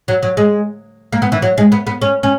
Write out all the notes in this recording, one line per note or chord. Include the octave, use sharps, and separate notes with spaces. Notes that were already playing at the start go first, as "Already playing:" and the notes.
F#3
F#3
G#3
A#3
B3
E3
F#3
G#3
B3
B3
C#4
C#4